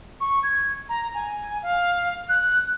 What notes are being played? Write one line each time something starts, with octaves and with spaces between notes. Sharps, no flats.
C#6
G#6
A#5
G#5
F5
F#6